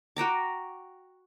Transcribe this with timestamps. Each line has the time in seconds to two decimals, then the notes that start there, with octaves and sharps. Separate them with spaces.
0.17 F#4 G5 A#5 D6